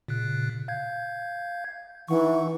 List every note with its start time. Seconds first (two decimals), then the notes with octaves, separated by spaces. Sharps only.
0.08 A#2 C#3 F#6
0.68 F5 G6 G#6
2.08 E3 D#4 F#5 C#6